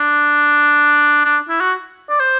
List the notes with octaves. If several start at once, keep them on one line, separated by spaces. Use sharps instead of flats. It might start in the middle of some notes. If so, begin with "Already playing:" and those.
Already playing: D4
D4
E4
F#4
D5
C5